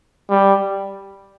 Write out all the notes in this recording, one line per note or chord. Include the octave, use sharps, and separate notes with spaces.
G3